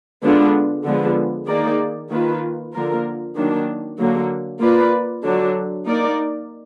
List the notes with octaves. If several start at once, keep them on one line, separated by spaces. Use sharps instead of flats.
D3 G#3 B3 D4 F4
D3 F3 G#3 B3
D#3 A#3 D#4 G#4 D5
D#3 A#3 F4 B4
D3 F3 A#3 F4 A#4
D#3 F#3 A#3 D4
D3 F#3 A#3
A#3 F4 B4 D5
D3 F#3 D4
A#3 D#4 A#4 D5